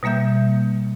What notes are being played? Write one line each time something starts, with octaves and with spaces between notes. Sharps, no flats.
B2 G3 A#3 E5 G6